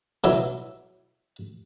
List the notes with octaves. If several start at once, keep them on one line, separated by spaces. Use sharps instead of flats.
B2 F#3 E4